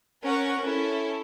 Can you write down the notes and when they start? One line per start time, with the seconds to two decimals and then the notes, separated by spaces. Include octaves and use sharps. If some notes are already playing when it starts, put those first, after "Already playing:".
0.23 C#4 A#4 F#5 C#6
0.61 C#4 E4 A4